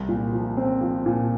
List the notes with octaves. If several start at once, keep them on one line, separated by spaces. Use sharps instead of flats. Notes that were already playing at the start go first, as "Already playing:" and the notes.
Already playing: C2
A#2
F3
C4
F3
A#2